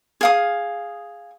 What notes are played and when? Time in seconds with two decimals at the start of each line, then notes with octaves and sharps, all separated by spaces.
0.21 G#4 F5 D#6